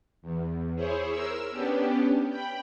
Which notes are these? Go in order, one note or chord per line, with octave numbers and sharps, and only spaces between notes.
E2
E4 G#4 C5 C#5
A#4 E6
B3 C#4 D4 G4
G5 B5